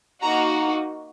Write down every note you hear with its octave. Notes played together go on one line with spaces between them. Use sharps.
A#3 D#4 F#4 A#5